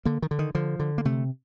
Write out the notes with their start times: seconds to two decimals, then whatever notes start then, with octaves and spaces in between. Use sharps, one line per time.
0.05 D3 A#3
0.22 D#3
0.31 D3
0.39 D#3
0.55 D3 F3
0.80 D3
0.98 A#3
1.05 C3 A3